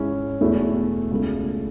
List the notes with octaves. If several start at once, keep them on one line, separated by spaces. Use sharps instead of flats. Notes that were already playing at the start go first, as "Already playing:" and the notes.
Already playing: G#2 G#3 C#4 E4
E2 B2 A3 E4
C#2 B2 A3